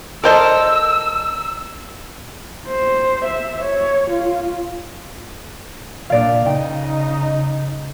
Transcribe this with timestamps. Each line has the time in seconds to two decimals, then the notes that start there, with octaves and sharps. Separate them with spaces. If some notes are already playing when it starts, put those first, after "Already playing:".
0.24 A4 A#4 C5 D5 D#5 E6
2.67 C5
3.25 E5
3.63 C#5
4.10 F4
6.10 A#2 D4 D5 F5
6.46 C#3 D#4 G5